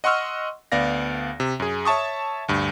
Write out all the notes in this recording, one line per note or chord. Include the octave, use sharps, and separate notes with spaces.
D#5 F#5 C6 C#6 E6 F6
D2 B3 D5 F5 A#6
C3
F#2 G#4
C#5 E5 A5 C#6 D#6
D2 G2